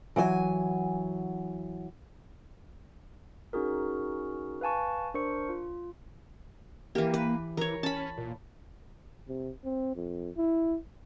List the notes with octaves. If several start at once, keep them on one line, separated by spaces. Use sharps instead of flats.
E3 F#3 D5 G#5
C#4 D#4 F#4 G#4 A#4
B4 F5 G#5 A5 C#6
D4 A#4 C5 C#6 C#7
F4
E3 A#3 G4
B4
E3 A#4 C#5
C#4 A5 B5
A#2
C3
C4
F2
E4